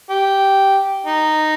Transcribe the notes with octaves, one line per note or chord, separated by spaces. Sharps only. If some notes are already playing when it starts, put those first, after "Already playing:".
G4
D#4